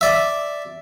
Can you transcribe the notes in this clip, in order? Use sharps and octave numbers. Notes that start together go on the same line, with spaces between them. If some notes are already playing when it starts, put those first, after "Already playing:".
D5 E5